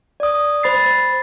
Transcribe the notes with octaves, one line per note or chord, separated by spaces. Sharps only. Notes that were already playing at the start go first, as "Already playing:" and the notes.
D5 D#6
C5 B5 A6 C7